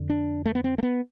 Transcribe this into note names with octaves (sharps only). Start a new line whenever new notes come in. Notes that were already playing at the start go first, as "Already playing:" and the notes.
Already playing: F2 D3
D4
A3
B3
C4
A3
B3